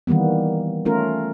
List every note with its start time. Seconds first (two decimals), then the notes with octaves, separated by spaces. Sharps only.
0.07 D#3 E3 G3 A#3 B3
0.85 A3 C#4 F4 A#4